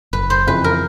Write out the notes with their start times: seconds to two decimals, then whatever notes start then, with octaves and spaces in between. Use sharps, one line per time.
0.13 F#1 B4
0.30 C5
0.47 F2 C#3 E3 B4
0.64 A#4